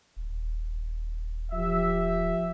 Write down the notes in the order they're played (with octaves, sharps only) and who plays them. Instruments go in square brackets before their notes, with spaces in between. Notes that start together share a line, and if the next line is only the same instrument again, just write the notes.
[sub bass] D#1
[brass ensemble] F3 G4 E5